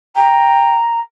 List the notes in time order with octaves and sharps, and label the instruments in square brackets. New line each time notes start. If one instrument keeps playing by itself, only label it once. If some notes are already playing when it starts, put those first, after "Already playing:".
[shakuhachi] G5 [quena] A#5